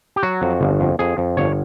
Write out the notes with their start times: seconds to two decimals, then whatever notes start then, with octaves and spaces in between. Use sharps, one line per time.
0.16 G4
0.23 F#3 F#4
0.42 F2
0.61 G1
0.80 F2
0.99 F2 G#4
1.18 F2
1.37 G1 C#5